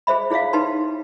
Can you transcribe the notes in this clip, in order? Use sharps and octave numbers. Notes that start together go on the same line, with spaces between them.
G#4 C5 E5 B5
E4 G#4 C#5 E5 F5
D#4 G4 B4 A5 C6